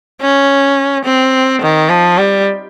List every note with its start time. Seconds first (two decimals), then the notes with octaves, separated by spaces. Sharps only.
0.22 C#4
1.05 C4
1.62 D#3
1.90 F3
2.18 G3